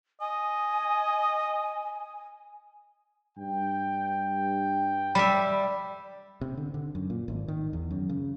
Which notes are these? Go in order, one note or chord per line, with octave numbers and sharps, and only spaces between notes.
D#5 G#5
G2 G5
G3 E5 B5
C3
D3
D3
F#2
A#2
G#1
D#3
E2
F#2
C#3